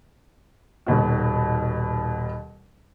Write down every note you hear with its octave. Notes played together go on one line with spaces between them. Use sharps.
D#1 D#2 B2 F#4